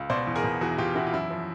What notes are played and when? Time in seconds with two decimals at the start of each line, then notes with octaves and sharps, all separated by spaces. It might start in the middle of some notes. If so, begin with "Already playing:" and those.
Already playing: C#2
0.10 B2 C5 D5
0.27 E2
0.35 G#4 A#4
0.44 B2
0.61 E2 F#4 G#4
0.78 B2 F4 G4
0.95 E2 E4 F#4
1.07 F4
1.13 F#2 E4
1.30 F3